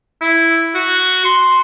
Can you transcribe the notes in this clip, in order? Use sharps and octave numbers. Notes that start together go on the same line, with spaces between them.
E4
F#4
C6